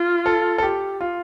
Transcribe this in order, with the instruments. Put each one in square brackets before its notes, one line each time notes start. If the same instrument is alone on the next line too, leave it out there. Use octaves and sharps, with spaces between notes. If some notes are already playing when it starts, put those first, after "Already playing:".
Already playing: [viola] F4
[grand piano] A4
A4
G4
F4